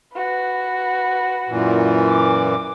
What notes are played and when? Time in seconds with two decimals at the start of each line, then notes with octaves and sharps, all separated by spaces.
0.14 F#4 B4
1.49 F#2 A#2 E3
2.09 D6